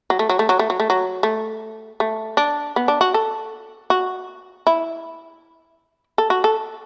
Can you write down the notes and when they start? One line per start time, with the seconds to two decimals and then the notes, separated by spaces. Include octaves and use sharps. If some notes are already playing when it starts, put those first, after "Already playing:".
0.10 F#3
0.19 A3
0.29 F#3
0.39 A3
0.49 F#3
0.59 A3
0.70 F#3
0.80 A3
0.90 F#3
1.23 A3
2.00 A3
2.37 D4
2.76 B3
2.88 D4
3.01 F#4
3.14 A4
3.90 F#4
4.67 E4
6.18 A4
6.30 F#4
6.44 A4